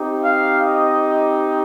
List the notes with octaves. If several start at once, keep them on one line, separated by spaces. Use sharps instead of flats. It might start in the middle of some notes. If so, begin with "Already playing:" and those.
Already playing: C4 D#4 G4
F5
D#5